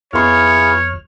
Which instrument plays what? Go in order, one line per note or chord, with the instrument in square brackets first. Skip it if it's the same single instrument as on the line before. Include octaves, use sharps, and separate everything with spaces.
[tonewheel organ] F2 F6 [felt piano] B3 C6 [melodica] E4 F4 G#4 [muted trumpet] C#5